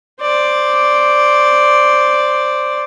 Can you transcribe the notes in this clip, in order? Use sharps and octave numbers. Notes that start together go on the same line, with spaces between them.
C5 D5